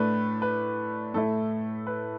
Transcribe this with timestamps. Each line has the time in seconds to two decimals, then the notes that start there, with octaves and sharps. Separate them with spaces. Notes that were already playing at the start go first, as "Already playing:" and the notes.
Already playing: A2 A3 D4 B4
0.42 B4
1.14 A2 A3 E4 A4
1.87 B4